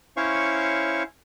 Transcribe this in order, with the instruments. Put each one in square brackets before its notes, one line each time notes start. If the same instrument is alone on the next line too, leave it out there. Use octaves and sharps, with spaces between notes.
[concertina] C#4 E4 C5 C#5 F5 C#6